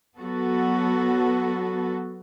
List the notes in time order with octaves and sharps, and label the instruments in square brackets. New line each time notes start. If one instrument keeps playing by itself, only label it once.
[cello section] F#3 B3 F#4 A4